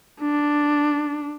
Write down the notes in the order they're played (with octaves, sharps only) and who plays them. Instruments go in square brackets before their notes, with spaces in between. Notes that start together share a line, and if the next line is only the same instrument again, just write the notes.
[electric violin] D4